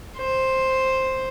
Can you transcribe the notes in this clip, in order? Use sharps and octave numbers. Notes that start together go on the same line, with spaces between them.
C5